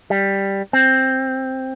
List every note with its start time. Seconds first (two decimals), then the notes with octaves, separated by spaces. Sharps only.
0.10 G3
0.73 C4